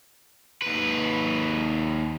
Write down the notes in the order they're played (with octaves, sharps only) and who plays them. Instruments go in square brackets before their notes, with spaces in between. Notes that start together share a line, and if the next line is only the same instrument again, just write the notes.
[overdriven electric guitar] D#2 B4